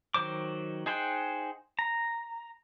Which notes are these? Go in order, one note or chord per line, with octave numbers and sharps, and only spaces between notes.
D#3 F#3 C5 D6
D#4 G#4 C5 F#5 G5
A#5